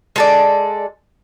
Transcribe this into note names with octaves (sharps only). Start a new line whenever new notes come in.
G#3 A4 D5